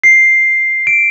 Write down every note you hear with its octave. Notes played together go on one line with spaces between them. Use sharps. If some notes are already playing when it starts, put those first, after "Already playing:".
C7
D7